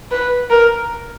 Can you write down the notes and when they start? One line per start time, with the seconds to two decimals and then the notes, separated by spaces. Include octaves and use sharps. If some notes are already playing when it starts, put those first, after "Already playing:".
0.11 B4
0.50 A#4